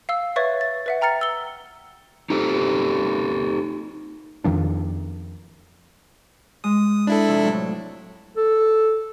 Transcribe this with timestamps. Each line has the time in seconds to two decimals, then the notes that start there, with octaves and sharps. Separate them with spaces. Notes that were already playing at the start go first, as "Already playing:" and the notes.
0.09 F5 E6
0.36 B4 C#5 E5 C#6 G#6 A6
0.61 A6
0.86 B4 E5 F#5
1.01 G5 A#5 F6 A6 C#7
1.21 E6 G7
2.30 D#4 G4 A4
4.44 F2 D#3 F3 D4
6.64 G#3 D#6
7.07 D4 E4 A4 B4
7.28 C3 F3 E6
7.43 A2 F#3
8.37 A4